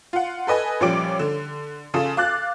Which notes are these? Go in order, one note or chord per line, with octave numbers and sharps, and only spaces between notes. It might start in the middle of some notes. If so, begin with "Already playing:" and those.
F4 F#5
A4 B4 D#5 G#5
A#1 F3 G3 C#4 D6 D7
D3
C#3 F4 A4
F5 D6 F#6 A6